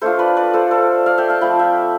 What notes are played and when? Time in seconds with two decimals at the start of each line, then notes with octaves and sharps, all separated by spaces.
0.01 A3 D4 F4 A4 C5
0.19 B4 D5
0.37 B4 D5
0.54 A4 C5
0.71 A4 C5
1.06 D5 F5
1.18 E5 G5
1.29 F5 A5
1.41 F3 A3 C4 G5 B5
1.59 E5 G5